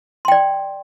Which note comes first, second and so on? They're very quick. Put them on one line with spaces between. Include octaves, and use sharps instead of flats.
C6 G5 D5